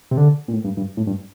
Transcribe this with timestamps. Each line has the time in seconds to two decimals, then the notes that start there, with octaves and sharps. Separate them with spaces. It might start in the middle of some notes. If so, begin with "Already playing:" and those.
0.11 C3
0.17 D3
0.48 A#2
0.53 A2
0.64 G2
0.77 G2
0.97 A2
1.07 G2